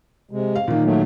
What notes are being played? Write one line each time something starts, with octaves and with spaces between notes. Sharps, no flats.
C3 G#3
F5
A#2 D#3 A#3
F#3 A3